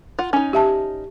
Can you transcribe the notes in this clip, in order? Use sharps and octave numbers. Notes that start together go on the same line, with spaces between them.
F4 F#5
C#4 D#4
G4 E5 A5